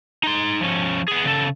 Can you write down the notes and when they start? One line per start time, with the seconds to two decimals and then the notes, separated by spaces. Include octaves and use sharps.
0.23 D#4 C6
0.61 F3 C#4
1.08 B3 G#4
1.25 C#3 A4